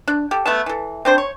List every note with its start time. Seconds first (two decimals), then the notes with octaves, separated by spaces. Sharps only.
0.08 D4
0.31 G4 A4
0.46 A3 B3 A5
0.66 E3 A4
1.05 C4 D4 C5
1.18 C#5